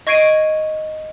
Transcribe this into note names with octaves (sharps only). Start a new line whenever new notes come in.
D#5 C#6 G#6 C7 D7 D#7